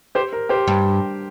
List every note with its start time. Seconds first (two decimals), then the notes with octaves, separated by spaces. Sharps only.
0.15 G4 C5
0.33 A#4
0.49 G4 C5
0.68 G2